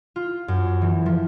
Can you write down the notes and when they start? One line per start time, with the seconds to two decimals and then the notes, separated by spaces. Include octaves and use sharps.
0.16 F4
0.48 F#2
0.82 E3
1.06 F3